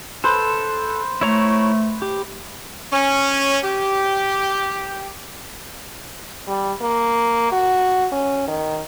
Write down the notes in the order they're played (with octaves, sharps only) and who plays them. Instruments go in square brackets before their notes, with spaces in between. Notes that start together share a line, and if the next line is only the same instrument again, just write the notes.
[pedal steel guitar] A4 [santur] B4 C5
[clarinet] A3 [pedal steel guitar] E4 C#5 A#5
[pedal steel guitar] G4
[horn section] C#4
G4
[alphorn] G3
A#3
F#4
C#4
D#3